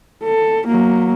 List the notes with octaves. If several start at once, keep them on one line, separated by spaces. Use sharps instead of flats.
A4
F#3 A#3